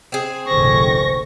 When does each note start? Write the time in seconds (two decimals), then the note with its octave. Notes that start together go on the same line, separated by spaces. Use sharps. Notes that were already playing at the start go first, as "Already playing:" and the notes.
0.12 C4 G#4
0.47 F1 A#1 D3 C5 C#6 A#6